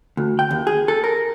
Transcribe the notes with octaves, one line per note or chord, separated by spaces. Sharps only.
D2
G5
D#2
G#4
A4
A#4